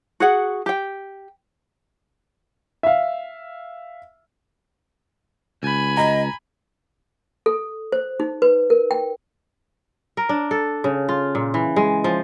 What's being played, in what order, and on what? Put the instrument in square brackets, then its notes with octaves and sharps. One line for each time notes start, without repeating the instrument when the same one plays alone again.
[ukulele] F#4 G#4 F#5
G4 G5
[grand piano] E5 F5
[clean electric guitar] C#2 [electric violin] G#5 B5
[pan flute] D#5 [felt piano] A#5
[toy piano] A4
C5
D#4
B4
A#4
G5
[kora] A#4
D4
A4
C#3
F4
A#2
E3
G#3
F3